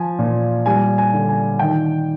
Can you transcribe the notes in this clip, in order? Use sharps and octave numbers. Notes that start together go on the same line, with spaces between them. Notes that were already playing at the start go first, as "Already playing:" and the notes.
Already playing: F3 G#5
A#2
G3 G#5
G#5
D3
G#5
D#3 G5